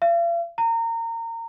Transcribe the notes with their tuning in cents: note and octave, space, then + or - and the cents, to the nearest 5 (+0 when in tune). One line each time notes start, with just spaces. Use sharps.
F5 -45
A#5 -25